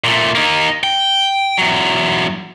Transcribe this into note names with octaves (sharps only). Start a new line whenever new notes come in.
A#2 A3
A#3 D#4
G5
E2 F#3